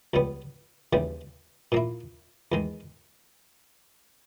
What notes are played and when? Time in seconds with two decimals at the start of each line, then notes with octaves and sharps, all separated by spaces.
0.14 C#2 C#3 G3 B3
0.93 D#2 C#3 E3 G3
1.72 A#2 A#3 E4
2.52 E2 D#3 G#3